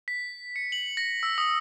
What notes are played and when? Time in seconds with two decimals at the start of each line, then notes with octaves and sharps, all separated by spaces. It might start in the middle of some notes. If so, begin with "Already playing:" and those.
0.08 B6
0.56 C#7
0.72 F#7
0.97 A#6
1.23 E6
1.38 D#6